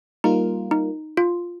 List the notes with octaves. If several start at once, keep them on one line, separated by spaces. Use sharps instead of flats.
G3 A#3 D#4 F4 A#4
D#4
F4